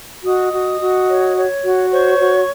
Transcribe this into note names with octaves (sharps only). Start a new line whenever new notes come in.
F#4 D#5 D#6
F#4
F#4
C#5
C#5
F#4
C5 C#5 C#6
F#4